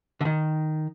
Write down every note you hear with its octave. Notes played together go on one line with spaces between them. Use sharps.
D3
D#3